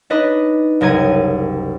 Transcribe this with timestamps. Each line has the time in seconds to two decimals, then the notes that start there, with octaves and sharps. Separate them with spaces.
0.10 D4 D#4 B4 D#5
0.81 F#1 C2 A#4 G#6 D#7